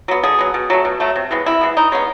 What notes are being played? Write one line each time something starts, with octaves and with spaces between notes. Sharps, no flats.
F#3 B3
D3 G#4
F#3 B3
B2
F#3 A3
B2
F#3 A3
C3
E3 G#3 B3
C3 E4
E3 G#3 B3
E3 D#4
G#3 B3 C#4